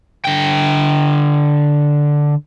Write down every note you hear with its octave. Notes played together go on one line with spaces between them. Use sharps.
D3 G5